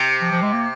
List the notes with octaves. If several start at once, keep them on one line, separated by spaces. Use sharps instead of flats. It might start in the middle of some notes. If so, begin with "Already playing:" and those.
Already playing: C3
F3
F3
G#3
A#3